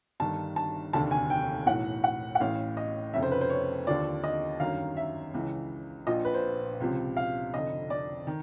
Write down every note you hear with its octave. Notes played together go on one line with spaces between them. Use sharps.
G1 G2 D#3 A5
A5
F1 D#2 D3 A5
G#5
G5
B1 A2 E3 F#5
F#5
F#5
A1 A2 E3 F5
D#5
F1 F2 C#3 E5
C5
B4
C5
C#5
D#2 D3 F3 D5
D#5
G1 F#2 D#3 F5
E5
C#2 C#3 E3
A#1 A#2 F3 D#5
B4
C5
C#2 C3 F3
F5
F1 F2 D3 D#5
D5
D#3